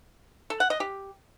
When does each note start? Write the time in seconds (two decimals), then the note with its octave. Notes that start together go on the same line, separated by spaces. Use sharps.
0.50 A4
0.60 F#5
0.70 D#5
0.80 G4